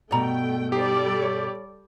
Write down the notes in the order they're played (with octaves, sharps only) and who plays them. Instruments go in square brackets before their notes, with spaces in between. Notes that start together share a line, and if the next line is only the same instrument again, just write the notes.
[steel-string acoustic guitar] G2 B2 [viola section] A3 G5 [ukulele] D5 A#5 B5
[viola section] G3 A4 D5 [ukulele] D#4 C5 [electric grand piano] G4
[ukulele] C#5